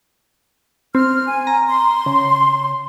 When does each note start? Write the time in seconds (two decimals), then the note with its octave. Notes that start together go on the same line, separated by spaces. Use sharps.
0.95 C4 F6
1.28 G#5
1.47 A#5
1.68 C6
2.06 C#3